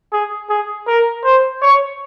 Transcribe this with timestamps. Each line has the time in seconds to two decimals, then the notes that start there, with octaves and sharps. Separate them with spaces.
0.13 G#4
0.50 G#4
0.87 A#4
1.25 C5
1.62 C#5